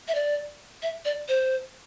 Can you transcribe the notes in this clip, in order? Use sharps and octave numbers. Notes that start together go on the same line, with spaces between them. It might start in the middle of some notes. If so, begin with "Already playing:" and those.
E5
D5
E5
D5
C5